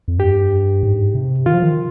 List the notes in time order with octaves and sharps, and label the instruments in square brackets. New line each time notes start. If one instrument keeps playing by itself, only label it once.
[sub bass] F2
[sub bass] G2 [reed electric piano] G4
[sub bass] G#2
C3
[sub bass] D#3 [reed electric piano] F4
[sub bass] F3
D#3